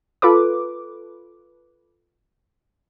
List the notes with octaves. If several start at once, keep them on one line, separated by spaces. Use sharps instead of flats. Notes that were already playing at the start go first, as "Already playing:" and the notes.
F4 A4 B4 D6